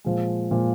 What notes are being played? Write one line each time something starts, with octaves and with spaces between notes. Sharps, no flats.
A#2 F3 G#3
A#2 F3 G#3